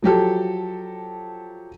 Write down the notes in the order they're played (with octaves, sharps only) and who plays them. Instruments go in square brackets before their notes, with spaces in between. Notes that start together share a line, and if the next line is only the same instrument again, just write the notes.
[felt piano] F3 F#3 G4 A4